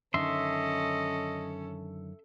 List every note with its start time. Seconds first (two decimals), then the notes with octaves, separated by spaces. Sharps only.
0.14 F#2 D3 D#3 C#4 A4 D#5 E5 C6